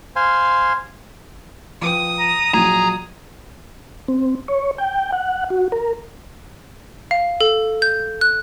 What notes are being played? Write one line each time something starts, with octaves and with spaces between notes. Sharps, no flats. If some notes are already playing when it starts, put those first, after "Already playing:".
C5 F5 G#5 C6
F3 B4 G5 D#6
A#5
A#1 F#3 G#4 A#5
C4
C#5
G5
F#5
F#4
A#4
F5
A4
G6
F#6